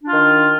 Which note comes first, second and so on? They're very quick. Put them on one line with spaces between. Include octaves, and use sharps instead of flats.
D4 F4 D#3